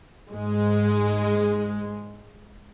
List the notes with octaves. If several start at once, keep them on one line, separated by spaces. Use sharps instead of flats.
G#2 G#3